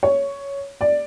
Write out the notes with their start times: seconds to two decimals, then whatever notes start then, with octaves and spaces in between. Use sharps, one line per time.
0.03 C#5
0.81 D5